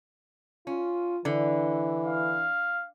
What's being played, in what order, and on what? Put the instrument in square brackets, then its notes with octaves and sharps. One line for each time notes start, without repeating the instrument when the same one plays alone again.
[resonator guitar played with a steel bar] C#4 [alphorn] F4
[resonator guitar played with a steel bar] D3 [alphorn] E3
[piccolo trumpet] F5